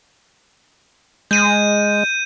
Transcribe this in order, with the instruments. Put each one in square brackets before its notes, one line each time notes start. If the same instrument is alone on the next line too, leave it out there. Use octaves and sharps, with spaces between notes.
[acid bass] G#3 [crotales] G6 D#7